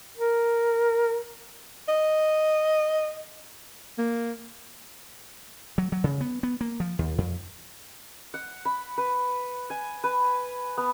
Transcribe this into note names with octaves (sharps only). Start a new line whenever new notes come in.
A#4
D#5
A#3
F#3
F#3
C#3
B3
B3
A#3
F3
D#2
F2
F#5
B5
B4
G#5
B4
B3